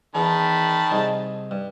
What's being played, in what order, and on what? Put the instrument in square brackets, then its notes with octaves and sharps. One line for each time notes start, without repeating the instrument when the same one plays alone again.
[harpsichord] E2 [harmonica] D#3 A5 B5
[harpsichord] C2 D#4 G#4
G2